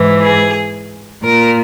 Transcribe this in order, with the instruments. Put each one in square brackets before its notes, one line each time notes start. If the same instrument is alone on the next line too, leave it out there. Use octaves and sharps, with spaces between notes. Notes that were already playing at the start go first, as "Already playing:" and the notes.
Already playing: [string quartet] G#2 E3
G#4
A#2 A#4